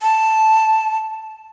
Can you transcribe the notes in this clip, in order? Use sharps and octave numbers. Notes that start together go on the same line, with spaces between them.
A5